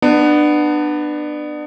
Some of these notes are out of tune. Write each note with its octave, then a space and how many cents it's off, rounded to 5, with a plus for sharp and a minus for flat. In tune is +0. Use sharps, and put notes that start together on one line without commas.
B3 +0 D4 +30